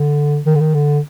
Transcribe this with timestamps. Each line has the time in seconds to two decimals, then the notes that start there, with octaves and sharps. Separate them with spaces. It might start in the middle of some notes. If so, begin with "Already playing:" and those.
Already playing: D3
0.46 D#3
0.55 D3
0.60 D#3
0.74 D3